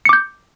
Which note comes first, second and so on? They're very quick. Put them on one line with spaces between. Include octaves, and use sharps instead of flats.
C#7 D6 G6